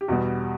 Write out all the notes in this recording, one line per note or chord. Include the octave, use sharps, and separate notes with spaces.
G4
E2 B2 G3 F#4